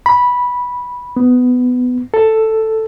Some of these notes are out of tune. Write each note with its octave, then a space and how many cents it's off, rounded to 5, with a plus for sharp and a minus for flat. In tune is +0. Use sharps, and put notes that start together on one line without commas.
B5 -10
B3 +15
A4 +5